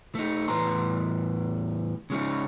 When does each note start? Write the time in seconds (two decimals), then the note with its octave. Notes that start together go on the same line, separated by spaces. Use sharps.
0.15 A3 D#4
0.48 E2 A2 C#3 B4 A#5 C6
2.10 C#3 G#3 C#4 D#4